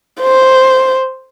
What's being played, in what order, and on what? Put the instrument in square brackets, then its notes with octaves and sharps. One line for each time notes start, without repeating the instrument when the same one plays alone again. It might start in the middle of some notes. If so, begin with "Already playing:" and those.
[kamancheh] C5